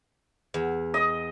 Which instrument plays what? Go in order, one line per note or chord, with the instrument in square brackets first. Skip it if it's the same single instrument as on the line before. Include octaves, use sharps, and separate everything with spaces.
[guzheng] E2
[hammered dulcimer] D#5